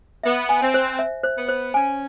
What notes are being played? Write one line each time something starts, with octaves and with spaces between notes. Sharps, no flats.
B3 E5
G#5
C4
C5
E5
C5
B3
C5
C#4 G#5